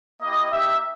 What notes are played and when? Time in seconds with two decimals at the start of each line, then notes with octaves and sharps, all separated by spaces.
0.21 A#3 E4 G4 D#5
0.49 A#3 D#4 G4 E5